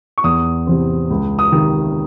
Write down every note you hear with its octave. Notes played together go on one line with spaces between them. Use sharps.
C#6
E2 D#6
C3 E3 C4
C#2
D#6
C3 D#3